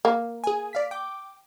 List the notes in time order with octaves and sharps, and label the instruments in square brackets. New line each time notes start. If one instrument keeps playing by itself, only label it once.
[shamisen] A#3
[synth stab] G#4 G#5
D5 F5 B6
G5 D6